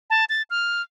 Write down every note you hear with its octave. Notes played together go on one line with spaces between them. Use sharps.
A5
A6
F6